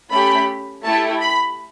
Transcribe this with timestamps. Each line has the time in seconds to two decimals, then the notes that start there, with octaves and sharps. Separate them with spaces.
0.11 A3 C#4 G4 B5
0.84 A3 E4 G4 A5
1.21 B5